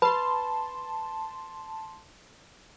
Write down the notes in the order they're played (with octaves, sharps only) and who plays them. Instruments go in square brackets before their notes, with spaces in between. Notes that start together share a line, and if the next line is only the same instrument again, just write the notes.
[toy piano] B4 B5 [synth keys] A5 C6